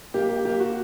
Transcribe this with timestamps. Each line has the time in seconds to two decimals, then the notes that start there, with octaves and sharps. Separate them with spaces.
0.14 A#3 G4
0.29 G4
0.45 A#3 G4
0.60 F#4